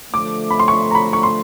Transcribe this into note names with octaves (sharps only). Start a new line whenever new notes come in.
D3 F3 A3 D6
B5
C6
C#6
A#5
B5
C#6
C6